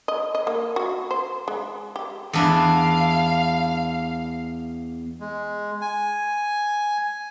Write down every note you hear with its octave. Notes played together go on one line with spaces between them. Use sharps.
D#5
D#5
A#3
F#4
C5
G#3
G4
E2 D4 E4 F5
G#3
G#5